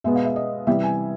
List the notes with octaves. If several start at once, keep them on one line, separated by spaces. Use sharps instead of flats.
B2 G#3 B3 E5
F5
E5
D#5
C3 E3 G3 E5
G#5